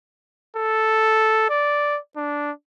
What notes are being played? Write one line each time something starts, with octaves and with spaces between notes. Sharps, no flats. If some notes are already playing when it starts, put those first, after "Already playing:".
A4
D5
D4